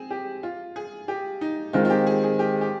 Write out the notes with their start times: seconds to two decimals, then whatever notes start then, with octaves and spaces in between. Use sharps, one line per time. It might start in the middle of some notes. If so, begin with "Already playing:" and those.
Already playing: C4 G#4
0.10 G4
0.43 F4
0.76 G#4
1.08 G4
1.41 D#4
1.73 D#3 G#3 C4 F4
1.85 F4
1.90 G4
2.06 G#4
2.24 G#4
2.39 G4
2.61 G4